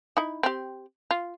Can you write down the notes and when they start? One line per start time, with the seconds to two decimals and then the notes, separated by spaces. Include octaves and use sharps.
0.17 D#4 E4
0.43 C4 G4
1.11 F4